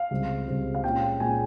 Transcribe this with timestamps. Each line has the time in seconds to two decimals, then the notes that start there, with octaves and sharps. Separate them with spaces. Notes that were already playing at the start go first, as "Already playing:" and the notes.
Already playing: F5
0.11 C#2 C3 G3 C4
0.48 C#2 C3 G3 C4
0.75 F5
0.83 A#2 G#3 C#4 F4 G5
1.20 A#2 G#3 C#4 F4 G#5